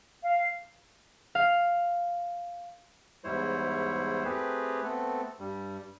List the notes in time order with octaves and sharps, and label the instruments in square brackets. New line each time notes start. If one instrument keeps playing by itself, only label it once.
[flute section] F5
[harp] F5
[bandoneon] E2 G#2 G3 E4 C5 C#5
A3 C4 G4 G#4 B4
A3 B3 C4 A4
G2 G3